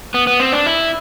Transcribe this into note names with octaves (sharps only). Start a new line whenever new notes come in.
B3
B3
C4
D4
E4